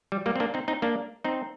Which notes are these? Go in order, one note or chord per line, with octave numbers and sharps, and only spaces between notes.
G3
G3 A#3
C4
A#3 D4
C4 D#4
C4 D#4
A#3 D4
C4 D#4